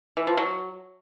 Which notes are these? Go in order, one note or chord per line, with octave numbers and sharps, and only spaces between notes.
E3
F3
F#3